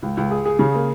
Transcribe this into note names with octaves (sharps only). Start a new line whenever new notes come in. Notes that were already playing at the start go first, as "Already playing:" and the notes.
C#2
C#2
G#4
G#4
C#3
A#3